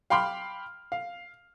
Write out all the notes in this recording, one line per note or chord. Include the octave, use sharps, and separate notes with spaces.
F5 G5 B5 C6 D6 F6
F5